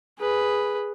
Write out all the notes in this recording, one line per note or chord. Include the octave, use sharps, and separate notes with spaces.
G#4 B4